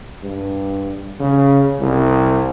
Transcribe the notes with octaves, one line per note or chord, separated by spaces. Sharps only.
G2
C#3
C2